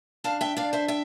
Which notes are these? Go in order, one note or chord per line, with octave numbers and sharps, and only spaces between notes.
D4 F5 A5
E5 G5
D4 D5 F5
C5 E5
E5 G5